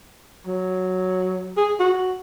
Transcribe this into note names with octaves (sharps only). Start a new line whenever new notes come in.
F#3
G#4
F#4